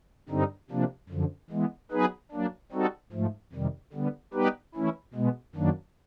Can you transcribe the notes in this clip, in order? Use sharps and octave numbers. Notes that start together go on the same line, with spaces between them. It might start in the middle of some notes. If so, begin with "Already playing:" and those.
G2 D3 G3 C4 D#4
C3 F3 A#3 D4
F#2 D3 F3
E3 G#3 B3
F#3 B3 D#4 G#4 B4
F#3 A#3 D4
G3 C4 D#4 F#4 A4
G#2 F3 A3
F2 C3 D#3 G3
D3 G3 B3
G3 B3 D#4 G4 B4
E3 A3 C#4 E4
B2 G#3 B3
F#2 D#3 F#3 A#3 D4